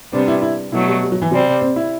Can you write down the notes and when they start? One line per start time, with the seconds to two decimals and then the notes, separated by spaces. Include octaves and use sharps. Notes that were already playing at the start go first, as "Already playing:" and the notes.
0.12 C3 G3 B3 C4 D4
0.28 E4
0.42 E4
0.72 B2 F#3 A3 E4
0.87 G3
1.02 G3
1.12 F#3
1.22 E3
1.32 C3 F#3 G3 C4
1.61 C4
1.76 E4